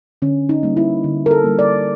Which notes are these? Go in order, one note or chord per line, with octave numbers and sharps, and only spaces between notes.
D3 C#4
D#4
G3 A#3
E4
D3
A#4
A4
G3 A#3
D5